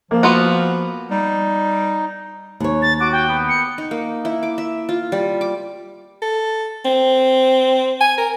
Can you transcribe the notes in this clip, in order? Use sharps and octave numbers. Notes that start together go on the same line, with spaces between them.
F3 A#3
B3 F4 F#4
G3 D#4
D#2 C#5
A6
F#4 D6
G5
B3
C#7
D#4
A#3
E4
D6
E5
F4
G3
D6
A4
C4
G#5
A#4